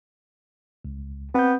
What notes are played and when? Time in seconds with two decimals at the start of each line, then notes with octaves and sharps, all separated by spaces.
0.85 C#2
1.35 B3 C4 G6